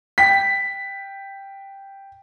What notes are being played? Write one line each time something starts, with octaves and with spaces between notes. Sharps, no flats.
G5 B6